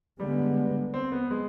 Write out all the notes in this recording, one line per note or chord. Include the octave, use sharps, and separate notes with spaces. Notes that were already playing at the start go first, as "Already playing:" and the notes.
D3 G3 G#3 B3
C4
B3
G#3